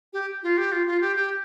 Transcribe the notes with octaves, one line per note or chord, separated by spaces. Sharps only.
G4
F4
G4
F4
F4
G4
G4